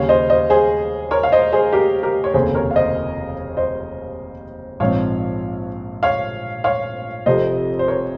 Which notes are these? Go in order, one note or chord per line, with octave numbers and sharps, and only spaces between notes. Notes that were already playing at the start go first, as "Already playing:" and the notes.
Already playing: D#2 C#3 G3 C#4 C#5 F5
C5 D#5
C5 D#5
G#4 C5
A#4 C#5
F5
C5 D#5
G#4 C5
G4 A#4
G4 A#4
C#5
F1 D#2 C#3 G#4 C5
A#4 C#5
F5
C5 D#5
C5 D#5
A#1 G#2 F3 C4 C#5 F5
C#5 F5
C#5 F5
F1 F2 C3 C5 D#5
C5
A#4 C#5